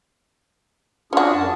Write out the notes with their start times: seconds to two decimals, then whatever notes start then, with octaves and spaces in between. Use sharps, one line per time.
1.13 C#4 D4 F4 F#4 G#4
1.32 F#2 A5